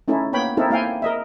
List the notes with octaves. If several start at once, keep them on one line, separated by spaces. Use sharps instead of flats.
A3 C#4 D#4 E4 A4
A#3 B3 C#5 G5 B5
C4 D#4 E4 A4 A#4
A#3 E4 F5 G5 G#5
A#4 D#5 E5